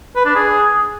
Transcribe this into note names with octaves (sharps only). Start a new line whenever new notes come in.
B4
D4
G#4